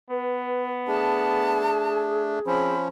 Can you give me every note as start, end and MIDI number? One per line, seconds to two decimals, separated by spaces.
0.10 1.71 59
0.10 0.69 71
0.88 2.39 57
0.88 2.39 62
0.88 2.74 68
0.88 1.98 81
2.47 2.88 53
2.47 2.76 60
2.47 2.88 61
2.47 2.79 83